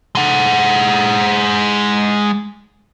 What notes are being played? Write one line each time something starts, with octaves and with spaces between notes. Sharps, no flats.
G#3 F#5